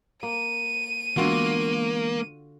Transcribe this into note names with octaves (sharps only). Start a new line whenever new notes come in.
A#3 D#7
D3 E3 G#3 A#3 B3 F4 F#4